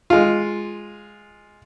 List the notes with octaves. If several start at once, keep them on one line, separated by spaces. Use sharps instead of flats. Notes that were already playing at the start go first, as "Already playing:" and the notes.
G#3 F4